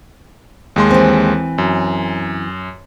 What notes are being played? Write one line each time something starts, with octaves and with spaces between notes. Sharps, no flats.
D#2 G#3 C6
E3 C4
F#2